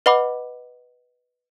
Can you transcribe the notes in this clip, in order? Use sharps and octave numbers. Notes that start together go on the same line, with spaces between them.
B4 D#5 F#5 B5 D6